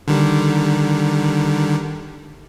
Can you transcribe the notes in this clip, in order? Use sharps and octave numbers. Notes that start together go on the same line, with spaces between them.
D3 D#3 G3